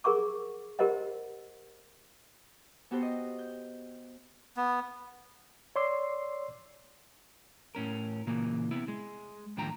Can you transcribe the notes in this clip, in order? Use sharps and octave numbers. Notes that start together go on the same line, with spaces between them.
G#4 A#4 F#5 C#6 D6
G4 A#4 C5 D#5 F#5
B3 F#4 G4 A4 C5
D#5
G6
B3
C#5 D5 C6 D6 E6 C7
A2 C#4 A#4
A#2 C#3 E3 A#3
C3 B3 E4
G#3
D#2 A2 D3 F3 G5 A#5